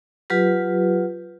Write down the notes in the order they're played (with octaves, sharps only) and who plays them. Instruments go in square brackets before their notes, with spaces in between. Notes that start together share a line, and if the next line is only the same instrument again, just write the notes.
[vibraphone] F#3 F4 G4 B4